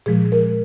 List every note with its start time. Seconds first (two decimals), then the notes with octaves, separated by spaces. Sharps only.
0.06 A#2 F3 G#3 G#4
0.32 A#4